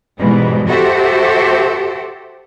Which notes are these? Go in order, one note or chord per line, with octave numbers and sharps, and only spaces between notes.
G#2 B2 E3 G3 G#3
F#4 G4 A4 C5 E5